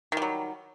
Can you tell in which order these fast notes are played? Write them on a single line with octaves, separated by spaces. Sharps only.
D#3 G3 F#3